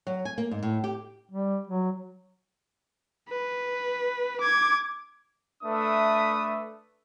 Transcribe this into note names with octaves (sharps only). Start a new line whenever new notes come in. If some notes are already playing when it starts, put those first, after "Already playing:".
F#3
G#5
A#3
G#2
A2
G4
G3
F#3
B4
D6 G#6
A3 D4 B4 E5 D#6